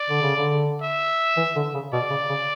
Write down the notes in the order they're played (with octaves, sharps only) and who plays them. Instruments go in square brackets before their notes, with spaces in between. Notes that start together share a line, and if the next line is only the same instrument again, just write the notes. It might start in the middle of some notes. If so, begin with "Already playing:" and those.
Already playing: [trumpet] D5
[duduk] D3
C#3
D3
[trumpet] E5
[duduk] E3
D3
C#3
[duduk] B2 [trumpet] D5
[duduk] C#3
C#3